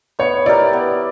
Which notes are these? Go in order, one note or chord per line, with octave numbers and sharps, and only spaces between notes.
B3 C#5
E4 G4 A#4 D5
B3